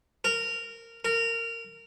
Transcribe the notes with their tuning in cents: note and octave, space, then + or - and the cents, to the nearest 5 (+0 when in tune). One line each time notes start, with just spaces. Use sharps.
A#4 -15
A#4 -20